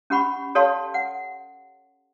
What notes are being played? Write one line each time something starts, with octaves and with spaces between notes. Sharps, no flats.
C#4 G4 F#5 B5 C#6
G4 A4 C#5 F5 A5 C6
F#5